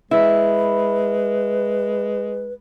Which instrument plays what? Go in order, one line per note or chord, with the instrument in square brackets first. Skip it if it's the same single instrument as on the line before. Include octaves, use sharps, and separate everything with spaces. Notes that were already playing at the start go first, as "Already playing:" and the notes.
[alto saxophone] G#3 [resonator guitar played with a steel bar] E4 [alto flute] B4